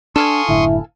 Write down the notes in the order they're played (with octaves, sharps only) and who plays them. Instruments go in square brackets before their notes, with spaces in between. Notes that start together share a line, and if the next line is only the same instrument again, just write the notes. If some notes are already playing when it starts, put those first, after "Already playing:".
[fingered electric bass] D4 [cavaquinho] A4 F5 G#5 [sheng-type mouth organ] C6 C#6 D#6
[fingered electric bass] F#1 A2 D3 [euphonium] E4